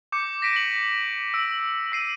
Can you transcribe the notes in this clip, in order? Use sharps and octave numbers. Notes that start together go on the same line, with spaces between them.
D6 G6 C#7
A#6 B6 D7 D#7
F#7
E6 D7
E6 C7 D#7